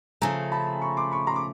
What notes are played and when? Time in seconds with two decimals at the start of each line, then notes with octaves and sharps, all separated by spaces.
0.21 C#3 F3 A3 G#5 A#5
0.52 A5 B5
0.81 B5 C#6
0.97 C6 D6
1.11 B5 C#6
1.27 A#5 C6
1.36 D6